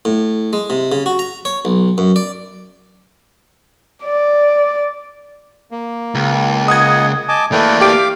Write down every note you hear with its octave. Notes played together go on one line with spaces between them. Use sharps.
A2
G#3
C3
C#3
F#4
A#5
C#5
B1
F#2
D5
D5
A#3
C#2
D#5 F#5 D#6 G#6
D#5 G#5 A5 D6
E3 A3 A#3 A4 B4 D5 G5
G4 F5 D6 D7